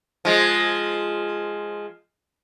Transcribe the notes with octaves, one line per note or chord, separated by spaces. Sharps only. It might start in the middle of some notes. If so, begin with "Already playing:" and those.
F3 G#3